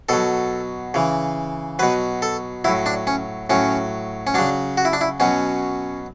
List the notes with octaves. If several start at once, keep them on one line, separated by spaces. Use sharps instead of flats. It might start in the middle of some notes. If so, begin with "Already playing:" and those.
B2 F#3 A4
C#3 E3
B2 F#3 B4
A4
A2 F#3 E4
D4
C#4
A2 F#3 C#4
C#4
C#3 F#3 D4
F#4
E4
D4
E4
B2 F#3 C#4